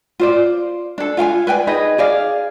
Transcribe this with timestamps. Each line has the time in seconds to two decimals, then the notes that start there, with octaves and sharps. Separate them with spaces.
0.20 F4 C5 D5
0.98 D4 A4
1.17 F4 F5 G5 G#5
1.47 B4 D5 G5 G#5
1.67 D#4 G#4 B4 D#5
1.98 G#4 D5 F5